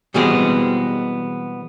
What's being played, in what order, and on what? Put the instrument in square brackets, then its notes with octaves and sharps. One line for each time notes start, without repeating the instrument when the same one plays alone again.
[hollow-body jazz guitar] B2 E3 G3 G#3 B3 C4